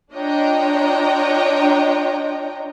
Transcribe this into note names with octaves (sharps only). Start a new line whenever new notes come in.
D4 F4 C#5 D#5 G5 A#5